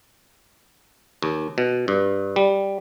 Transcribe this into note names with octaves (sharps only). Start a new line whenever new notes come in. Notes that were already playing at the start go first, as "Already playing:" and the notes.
D#2
B2
G2
G3